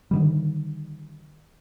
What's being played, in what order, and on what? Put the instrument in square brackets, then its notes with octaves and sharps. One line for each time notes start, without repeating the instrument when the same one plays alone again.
[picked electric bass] D3 D#3 G3